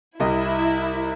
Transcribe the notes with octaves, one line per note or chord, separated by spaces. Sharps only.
C2 G3 E4 D#5